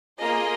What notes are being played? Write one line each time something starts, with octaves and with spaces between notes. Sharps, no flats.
A#3 F4 G#4 D#5